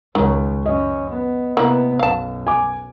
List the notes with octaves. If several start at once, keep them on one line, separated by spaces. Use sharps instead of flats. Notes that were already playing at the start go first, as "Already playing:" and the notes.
C#2 D#3 G#3 C#5
F#2 C#4 D#5
B3
C3 A#3 B3 E4
B1 F#2 F5 A5
G#5 D6